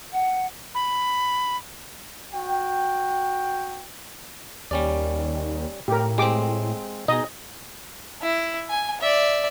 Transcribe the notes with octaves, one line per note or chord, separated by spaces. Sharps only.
F#5
B5
F#4 G5
D#2 G3 C#4 D5
A2 G4 A#4
G#3 C4 G4 D6
B2 D#4 G#4 D#5
E4
G#5
D5 E5